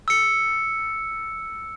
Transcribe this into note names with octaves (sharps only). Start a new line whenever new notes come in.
E6 C#7